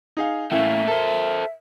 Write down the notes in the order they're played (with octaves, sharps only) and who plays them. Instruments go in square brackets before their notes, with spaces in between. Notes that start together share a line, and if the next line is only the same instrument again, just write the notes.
[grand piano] D#4 G#4 F5
[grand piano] A2 E3 C#4 [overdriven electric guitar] A3 A#3 [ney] E5
[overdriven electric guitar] A4 C5 [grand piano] A#4